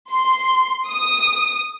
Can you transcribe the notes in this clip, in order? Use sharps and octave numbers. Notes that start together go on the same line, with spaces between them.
C6
D#6